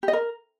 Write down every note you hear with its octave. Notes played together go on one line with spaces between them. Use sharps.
G4
D#5
A#4